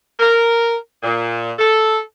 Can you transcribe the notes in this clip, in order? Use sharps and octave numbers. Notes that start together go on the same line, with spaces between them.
A#4
A#2
A4